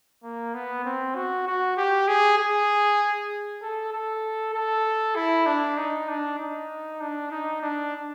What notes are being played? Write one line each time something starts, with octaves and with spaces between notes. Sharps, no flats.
A#3
B3
C4
F#4
F#4
G4
G#4
G#4
A4
A4
A4
E4
D4
D#4
D4
D#4
D4
D#4
D4